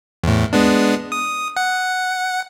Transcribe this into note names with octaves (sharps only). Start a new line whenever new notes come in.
E2 A2
G#3 B3 D4
D#6
F#5